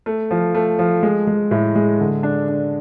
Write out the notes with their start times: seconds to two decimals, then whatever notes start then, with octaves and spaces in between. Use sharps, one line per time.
0.06 A3
0.31 F3
0.55 A3
0.79 F3
1.03 G#3
1.27 G#3
1.51 A2
1.75 G#3
2.00 D3
2.23 D4
2.48 D4